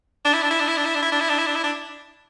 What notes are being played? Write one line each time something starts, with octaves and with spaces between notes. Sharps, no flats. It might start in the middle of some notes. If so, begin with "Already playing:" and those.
D4
E4
D4
E4
D4
E4
D4
E4
D4
E4
D4
E4
D4
E4
D4
E4
D4